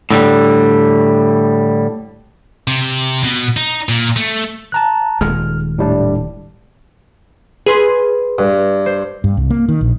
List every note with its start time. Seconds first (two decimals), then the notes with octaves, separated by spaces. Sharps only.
0.11 A2 D3 G3
2.68 C3
3.23 B2
3.57 D#4
3.89 A#2
4.17 A3
4.72 A5 A#5 F#6
5.21 D#1 D#3 G#3 F6
5.78 A2 G3 D4
7.66 G#4 B4 C6
8.39 G2
8.86 C5
9.24 G2
9.37 C2
9.50 A#3
9.69 D#3
9.81 A#1